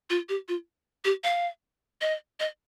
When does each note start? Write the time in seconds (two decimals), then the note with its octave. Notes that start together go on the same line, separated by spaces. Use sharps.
0.10 F4
0.29 G4
0.48 F4
1.05 G4
1.24 F5
2.01 D#5
2.40 D#5